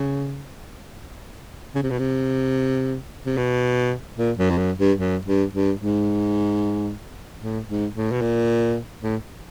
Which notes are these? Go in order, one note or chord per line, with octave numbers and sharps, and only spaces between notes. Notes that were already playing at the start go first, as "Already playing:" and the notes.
Already playing: C#3
C#3
C3
B2
C3
C3
B2
A#2
F#2
F2
F#2
G2
F#2
G2
G2
G#2
A2
G#2
A2
B2
A#2
A2